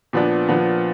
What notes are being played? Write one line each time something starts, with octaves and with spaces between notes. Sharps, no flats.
A#2 F3 B3 D4
A#2 F3 B3 D4